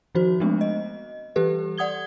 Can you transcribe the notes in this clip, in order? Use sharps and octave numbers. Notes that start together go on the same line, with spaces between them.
D#3 F3 D#4 F#4 C5
F3 G#3 A3 B3 C4 D4
D#5
E3 G3 G4 A4 B4
D5 F#5 D#6 G#6 G7